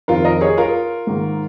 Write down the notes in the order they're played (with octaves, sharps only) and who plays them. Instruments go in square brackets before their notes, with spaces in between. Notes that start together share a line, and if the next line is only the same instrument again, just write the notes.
[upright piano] F2 D#3 F4 A#4
A#4 D#5
G#4 C#5
F4 A#4
G#2 D#3